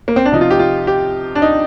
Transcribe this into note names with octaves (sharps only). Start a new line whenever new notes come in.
A#3
C4
D4
C3 F3 D#4
F4
G4
F4
G4
D4
D#4